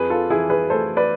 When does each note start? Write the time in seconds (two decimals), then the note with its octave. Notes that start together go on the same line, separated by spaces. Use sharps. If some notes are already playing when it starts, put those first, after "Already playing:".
Already playing: F2 G#4 B4
0.10 F4 A4
0.30 E3 E4 G#4
0.50 G#4 B4
0.70 A3 A4 C5
0.97 B4 D5